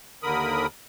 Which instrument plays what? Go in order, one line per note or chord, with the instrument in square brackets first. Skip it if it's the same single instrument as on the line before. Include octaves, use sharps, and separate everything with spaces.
[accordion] D#2 D3 A#4 B5 D#6